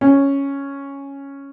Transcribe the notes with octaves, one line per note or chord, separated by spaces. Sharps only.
C#4